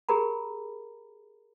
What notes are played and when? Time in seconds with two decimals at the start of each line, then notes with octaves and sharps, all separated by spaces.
0.09 G4 G#4 A#4 A#5 B5